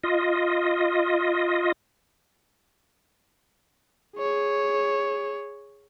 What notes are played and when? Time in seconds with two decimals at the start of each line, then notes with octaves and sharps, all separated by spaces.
0.03 F4 D#5
4.16 G#4 C#5